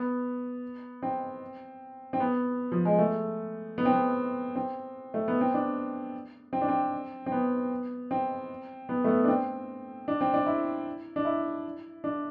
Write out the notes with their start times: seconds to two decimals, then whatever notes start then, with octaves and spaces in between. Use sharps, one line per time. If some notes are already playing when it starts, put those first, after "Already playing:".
Already playing: B3
1.02 C4
2.13 C4
2.20 B3
2.72 F3
2.85 G#3
2.99 A3
3.78 B3
3.85 C4
3.93 B3
4.56 C4
5.14 A3
5.28 B3
5.41 C4
5.54 D4
6.53 C4
6.61 D4
6.68 C4
7.26 C4
7.32 B3
8.11 C4
8.89 B3
9.04 A3
9.08 B3
9.24 D4
9.28 C4
10.08 D4
10.21 C4
10.34 D4
10.46 E4
11.16 D4
11.25 E4
12.04 D4